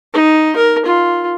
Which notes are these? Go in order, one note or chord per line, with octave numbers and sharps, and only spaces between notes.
D#4
A#4
F4